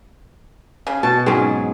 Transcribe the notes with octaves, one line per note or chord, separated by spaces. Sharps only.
C#3
B2 A5
G#2 F#3 C4 C#4 G#4